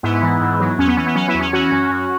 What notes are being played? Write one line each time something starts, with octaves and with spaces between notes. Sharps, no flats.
G#2 B3 E4
E3
G#2
F#3
E2 C#4
B3
E3 C#4
B3
F#3 C#4
B3 E4
E2
C#4
E3 C#4 F#4
F#2
F#2